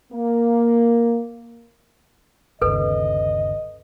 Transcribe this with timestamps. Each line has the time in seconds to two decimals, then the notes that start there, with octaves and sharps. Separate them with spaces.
0.13 A#3
2.62 G1 D#2 C#3 A4 B4 D#5